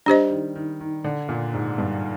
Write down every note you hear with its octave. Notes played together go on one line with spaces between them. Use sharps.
G3 D4 G4 C5 D#5
D#3
D#3
D#3
D3
A#2
G#2
G2